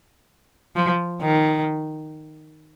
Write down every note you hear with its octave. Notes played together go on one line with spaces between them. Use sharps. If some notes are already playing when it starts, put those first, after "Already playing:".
F3
D#3